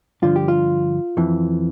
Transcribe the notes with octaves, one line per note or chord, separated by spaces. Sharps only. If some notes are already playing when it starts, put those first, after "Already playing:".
G2 D3 F3 F4
G4
F4
F2 E3